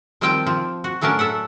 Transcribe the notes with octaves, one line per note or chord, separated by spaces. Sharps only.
D#3 F3 G3 C4 G5 A5
F3
F#4
A2 F#3 C#4 D4 A#4 A5
A4 E5 F#5